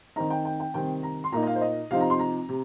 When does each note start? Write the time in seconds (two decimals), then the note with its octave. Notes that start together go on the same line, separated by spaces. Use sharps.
0.16 D#3 C4 D#4 A#5
0.30 G5
0.45 G5
0.60 G5
0.74 C3 D#3 G3 C4 G5
1.03 A#5
1.24 C6
1.32 A#2 A#3 D#4 A#5
1.43 D#5
1.47 F5
1.55 C5
1.61 D#5
1.91 C3 F3 C4 D#4 F5
2.01 A#5
2.10 C6
2.19 A#5
2.49 C3